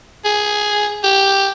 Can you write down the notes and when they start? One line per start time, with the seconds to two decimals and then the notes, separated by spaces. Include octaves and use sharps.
0.25 G#4
1.04 G4